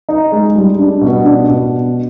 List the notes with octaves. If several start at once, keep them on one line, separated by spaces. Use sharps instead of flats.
D#4
G#3
G3
D4
B2
D4
B2